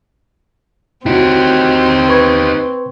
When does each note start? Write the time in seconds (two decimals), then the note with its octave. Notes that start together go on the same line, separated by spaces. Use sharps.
1.06 C4 D#4 E4 F#4 G4
2.09 B4 C#6 G#6